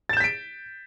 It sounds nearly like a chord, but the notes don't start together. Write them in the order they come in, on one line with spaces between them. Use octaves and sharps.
A6 E7 G6 B6 D7